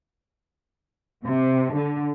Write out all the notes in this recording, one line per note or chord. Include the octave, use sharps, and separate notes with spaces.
C3
D3